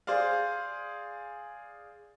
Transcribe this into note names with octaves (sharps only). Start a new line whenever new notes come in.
G#4 C5 D5 F5